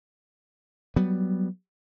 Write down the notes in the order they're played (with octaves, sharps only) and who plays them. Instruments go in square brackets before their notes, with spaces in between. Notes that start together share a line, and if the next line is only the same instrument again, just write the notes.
[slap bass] F#3 G3 B3